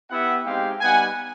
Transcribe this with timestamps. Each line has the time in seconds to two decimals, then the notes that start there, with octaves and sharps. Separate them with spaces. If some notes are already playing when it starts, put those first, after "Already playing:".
0.10 B3 E4 G4 E5 F#5
0.46 G#3 C4 D#4 G4 F5 G5
0.81 G3 B3 D#4 G4 F#5 G#5